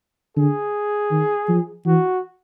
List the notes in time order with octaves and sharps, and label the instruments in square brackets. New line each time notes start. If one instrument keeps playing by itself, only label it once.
[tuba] D3 [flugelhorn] G#4
[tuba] D#3
F3
[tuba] E3 [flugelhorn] F#4